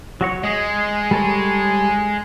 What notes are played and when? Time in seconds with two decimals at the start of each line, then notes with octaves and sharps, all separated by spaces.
0.21 F#3 F#4 C#5
0.44 G#3 D#5 D#6
1.11 G3 A4 C#5